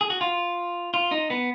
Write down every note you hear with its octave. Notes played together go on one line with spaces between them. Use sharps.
G#4
F#4
F4
F4
D#4
B3